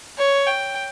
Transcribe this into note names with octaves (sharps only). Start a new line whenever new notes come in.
C#5
G5